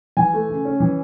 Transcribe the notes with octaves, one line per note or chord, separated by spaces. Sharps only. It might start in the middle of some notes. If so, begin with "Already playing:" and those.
E3 G#5
A3
C#3
C#4
E3